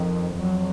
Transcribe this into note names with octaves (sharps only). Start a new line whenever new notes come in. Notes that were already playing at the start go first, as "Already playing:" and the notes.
Already playing: F2 D#3
F2 F#3